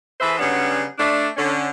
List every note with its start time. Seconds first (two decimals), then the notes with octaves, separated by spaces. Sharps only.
0.21 E3 A3 G#4 B4 C5 E5
0.39 C#3 F#3 G3 B3 C#4 D4
0.99 A3 D4
1.37 D3 C#4